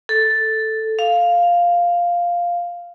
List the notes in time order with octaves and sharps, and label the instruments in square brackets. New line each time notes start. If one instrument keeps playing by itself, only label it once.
[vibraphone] A4
F5